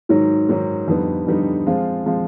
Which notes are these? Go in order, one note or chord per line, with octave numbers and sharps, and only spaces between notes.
G#2 D#3 F#3
G#2 D#3 F#3
F2 D3 G3 B3 D#4
F2 D3 G3 B3 D#4
F3 G#3 C4 F4
F3 G#3 C4 F4